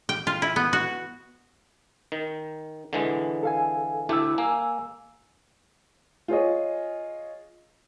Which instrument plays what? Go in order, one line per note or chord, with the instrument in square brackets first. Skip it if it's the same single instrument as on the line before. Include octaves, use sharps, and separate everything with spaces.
[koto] G5
F4
E4
B3
F#4
[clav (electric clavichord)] D#3
D3 E3 G#3
[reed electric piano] A4 F5 G#5
[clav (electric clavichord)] D2 A3 G4 [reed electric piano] E4 E6
[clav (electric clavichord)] A#3 [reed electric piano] G#5 E6
[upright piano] F4 G#4 C#5 D#5